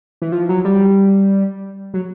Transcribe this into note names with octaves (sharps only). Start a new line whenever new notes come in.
E3
F3
F#3
G3
F#3